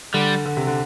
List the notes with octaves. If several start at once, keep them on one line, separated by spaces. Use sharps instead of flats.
D3 G3
D3
C3
D3